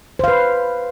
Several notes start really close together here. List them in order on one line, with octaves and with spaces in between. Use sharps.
C5 F5 B4